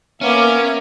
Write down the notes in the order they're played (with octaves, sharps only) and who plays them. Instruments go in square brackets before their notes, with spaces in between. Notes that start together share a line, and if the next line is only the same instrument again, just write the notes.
[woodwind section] A#3 [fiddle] B3 D6 [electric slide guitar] C#4 [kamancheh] A#4 E5